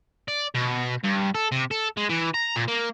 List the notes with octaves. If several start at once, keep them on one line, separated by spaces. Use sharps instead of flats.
D5
B2
G2
A4
C3
A4
G#3
E3
A#5
A#2
A#3